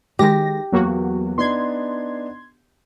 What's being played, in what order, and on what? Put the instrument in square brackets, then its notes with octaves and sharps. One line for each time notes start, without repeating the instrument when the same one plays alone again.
[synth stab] D#3 G#3 A#6 [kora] G4
[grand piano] E2 [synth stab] F#3 A#3 F#4
[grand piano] B3 D4 D#4 [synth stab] C6 G#6